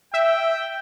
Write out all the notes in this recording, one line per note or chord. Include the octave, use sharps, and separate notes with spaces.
E5 G5